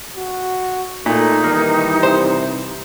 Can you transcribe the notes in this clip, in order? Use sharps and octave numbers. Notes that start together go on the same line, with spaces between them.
F#4
A#2 A3 D#4
D#3 E3 G3 A#3
C3 C5